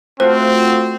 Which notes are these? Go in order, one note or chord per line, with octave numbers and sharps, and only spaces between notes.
A3 C4 F4 F#4 C5